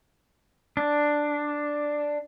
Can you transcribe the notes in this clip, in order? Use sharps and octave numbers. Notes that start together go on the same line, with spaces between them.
D4